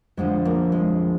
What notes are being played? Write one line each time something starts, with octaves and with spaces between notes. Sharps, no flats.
F2 D3 F3 G#3
A#3
G#3